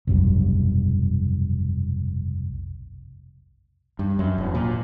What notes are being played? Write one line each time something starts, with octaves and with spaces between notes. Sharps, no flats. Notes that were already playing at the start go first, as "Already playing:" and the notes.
F1 B1 G2
G2
F#2
E1
A#2